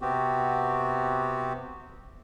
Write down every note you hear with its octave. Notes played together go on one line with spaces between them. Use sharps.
C3 B3 C4 F#4 G4